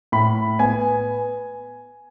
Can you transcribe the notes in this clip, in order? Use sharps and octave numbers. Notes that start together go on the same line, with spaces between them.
A2 B5
B3 G#5